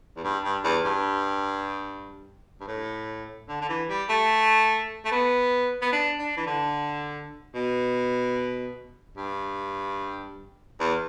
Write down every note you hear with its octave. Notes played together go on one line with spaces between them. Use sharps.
E2
G2
G2
E2
G2
G2
A2
D3
D3
E3
G3
A3
A3
B3
B3
D4
D4
E3
D3
B2
G2
E2